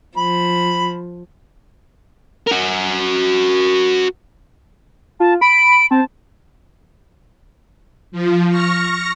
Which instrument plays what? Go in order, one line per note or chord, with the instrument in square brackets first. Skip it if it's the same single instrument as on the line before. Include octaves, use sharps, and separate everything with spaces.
[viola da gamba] F3 [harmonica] B5
[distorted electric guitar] F#4 A#4
[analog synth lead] F4 [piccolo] A5
[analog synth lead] B5 [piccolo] D7
[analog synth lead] C4 [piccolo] A5
[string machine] F3
C#6 F6 A#6